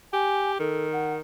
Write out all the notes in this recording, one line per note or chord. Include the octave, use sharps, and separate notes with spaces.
G4 G#5
D#3 A4
F#5